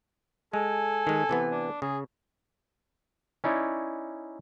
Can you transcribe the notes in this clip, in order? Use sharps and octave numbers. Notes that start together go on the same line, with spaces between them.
G#3 A4 G#5
D#3 G#3
C3 E3 B3
D4
C#3 G#4
C#4 D#4 E4 C#5 D5